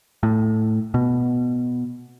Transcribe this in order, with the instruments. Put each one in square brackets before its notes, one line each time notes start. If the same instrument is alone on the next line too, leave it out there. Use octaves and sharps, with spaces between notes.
[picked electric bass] A2
B2